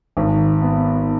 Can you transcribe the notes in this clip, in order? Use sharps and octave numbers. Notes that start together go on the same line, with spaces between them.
G#1
B3